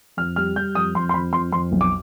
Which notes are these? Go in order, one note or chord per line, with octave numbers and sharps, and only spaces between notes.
F2 F6
G3 F6
G3 G6
F2 D#6
F2 C6
C6
F2 B5
F2 C6
F2 C6
B1
D6